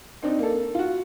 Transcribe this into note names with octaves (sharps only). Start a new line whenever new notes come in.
C4 D4 D#4
A#3 A4
F4 F#4